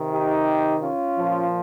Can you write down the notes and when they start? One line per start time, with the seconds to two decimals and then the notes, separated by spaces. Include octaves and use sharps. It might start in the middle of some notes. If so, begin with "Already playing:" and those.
Already playing: C3 D#3
0.14 D#4 G4
0.82 C#4 F4
1.18 A#2 F3